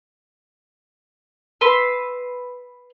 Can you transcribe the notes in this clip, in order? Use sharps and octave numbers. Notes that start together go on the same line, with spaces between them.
B4 C6 E6